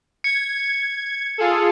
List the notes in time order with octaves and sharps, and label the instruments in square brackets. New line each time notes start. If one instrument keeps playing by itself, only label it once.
[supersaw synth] G#6 [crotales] C#7
[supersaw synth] F4 G#4 A4